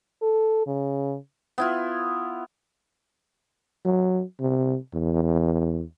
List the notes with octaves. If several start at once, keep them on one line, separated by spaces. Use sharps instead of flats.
A4
C#3
B3 E4 F4
F#3
C3
E2